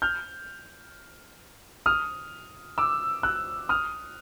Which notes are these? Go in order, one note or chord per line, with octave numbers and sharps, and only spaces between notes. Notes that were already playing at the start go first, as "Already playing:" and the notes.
F6 G6
D#6 F6
D6 E6
E6 F#6
D#6 F6